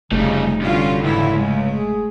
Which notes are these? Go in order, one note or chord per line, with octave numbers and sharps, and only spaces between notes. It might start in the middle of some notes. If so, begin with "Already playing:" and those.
F1 F2 C#3 G3 A3 D#4
G2 D3 C#4 F4 F#4
C#2 G#2 E3 E4
G#3 A3
G#4